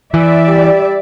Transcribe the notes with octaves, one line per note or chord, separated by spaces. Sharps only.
E3 D5 E5
G3